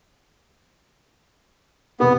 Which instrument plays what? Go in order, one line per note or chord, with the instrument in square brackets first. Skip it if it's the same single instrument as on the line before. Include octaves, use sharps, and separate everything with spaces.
[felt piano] F1 B2 G4 [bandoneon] B3